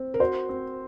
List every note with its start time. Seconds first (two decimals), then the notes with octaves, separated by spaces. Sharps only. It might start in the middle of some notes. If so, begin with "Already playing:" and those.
Already playing: C4
0.14 A#4
0.20 F#4 C5
0.49 C4